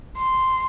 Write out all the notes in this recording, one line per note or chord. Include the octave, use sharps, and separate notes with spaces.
C6